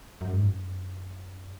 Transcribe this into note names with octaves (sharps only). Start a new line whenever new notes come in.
F#2
G#2
F#2